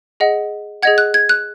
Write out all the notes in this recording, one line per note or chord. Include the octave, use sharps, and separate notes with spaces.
G#4 D#5 F#5
G#4 D#5 F#5 G#6
F#6
G#6
F#6